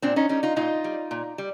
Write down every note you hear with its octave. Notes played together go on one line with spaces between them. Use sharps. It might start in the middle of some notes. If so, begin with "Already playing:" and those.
A#2 C4 D4
C#4 D#4
G3 C#4 D#4
D#4 F4
A#2 D#4 F4
G3
A#2
G3